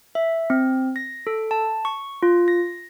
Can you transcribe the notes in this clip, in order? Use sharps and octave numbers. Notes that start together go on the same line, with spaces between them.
E5
C4
A#6
A4
A5
C#6
F4
A#6